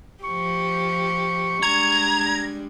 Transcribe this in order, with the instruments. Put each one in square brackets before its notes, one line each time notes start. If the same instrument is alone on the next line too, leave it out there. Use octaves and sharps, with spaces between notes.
[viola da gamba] F3 G4 [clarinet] C#6
[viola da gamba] G3 G#3 D4 [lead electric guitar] A#5 [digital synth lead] G#6